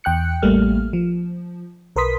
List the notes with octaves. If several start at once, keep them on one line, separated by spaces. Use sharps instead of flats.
E2 G5 F#6 C#7
A1 G3 A3 A#3 F6
F3
B1 A#4 B4 C6 D#6 B6